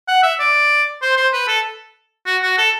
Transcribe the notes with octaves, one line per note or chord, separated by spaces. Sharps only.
F#5
E5
D5
C5
C5
B4
A4
F#4
F#4
A4